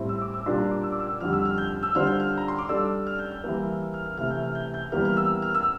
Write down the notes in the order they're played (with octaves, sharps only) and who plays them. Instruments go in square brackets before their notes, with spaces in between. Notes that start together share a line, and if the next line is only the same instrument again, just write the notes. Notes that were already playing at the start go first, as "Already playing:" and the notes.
Already playing: [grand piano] A2 G3 C4 E4
[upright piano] E6
D6
E6
[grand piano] A#2 G3 D4 [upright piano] C6
[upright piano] A#5
D6
E6
D6
E6
[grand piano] F2 D3 G3 [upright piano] F6
[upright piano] E6
F6
G6
E6
[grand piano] D3 G3 D4 F4 C5 [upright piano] F6
[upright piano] G6
F6
A#5
C6
D6
[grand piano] G3 D4 A4 D5 [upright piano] E6
[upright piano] F6
G6
G6
[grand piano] E3 G3 A#3
[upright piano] F6
F6
[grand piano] C3 E3 A3 [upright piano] F6
[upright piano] G6
F6
G6
G6
[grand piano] E2 E3 G3 A#3 [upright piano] F6
[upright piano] F6
E6
F6
E6